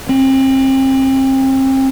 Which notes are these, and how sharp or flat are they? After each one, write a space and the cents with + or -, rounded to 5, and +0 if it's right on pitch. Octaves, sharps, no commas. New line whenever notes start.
C4 +35